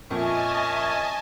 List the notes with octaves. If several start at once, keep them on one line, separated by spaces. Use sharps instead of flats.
F2 A#2 C#4 D#5 E5 G#5 A5 C#6